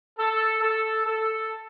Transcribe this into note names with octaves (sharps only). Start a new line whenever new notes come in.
A4
A4
A4